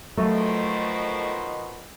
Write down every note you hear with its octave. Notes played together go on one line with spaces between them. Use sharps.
B2 D#3 F3 F#3 A3